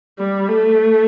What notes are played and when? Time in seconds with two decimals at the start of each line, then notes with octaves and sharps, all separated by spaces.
0.19 G3
0.48 A3